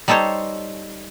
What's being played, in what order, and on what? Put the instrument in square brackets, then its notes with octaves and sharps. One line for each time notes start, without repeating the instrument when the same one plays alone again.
[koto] G3 D#4 A4 C5 C#5